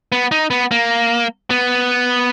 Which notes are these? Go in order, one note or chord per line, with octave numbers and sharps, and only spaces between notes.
B3
D#4
B3
A#3
B3